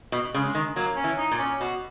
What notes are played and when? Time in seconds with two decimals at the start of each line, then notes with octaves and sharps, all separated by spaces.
0.12 B2
0.34 C#3 G#3
0.55 D#3
0.76 F#3 A#3
0.97 C#4
1.04 E3
1.17 D#4
1.32 A#2
1.39 C#4
1.60 B2 F#4